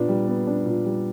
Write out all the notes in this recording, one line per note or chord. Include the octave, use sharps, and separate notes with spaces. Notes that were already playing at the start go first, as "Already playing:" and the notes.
Already playing: A#2 B3 D4
G3
B3
D4
A#2
G3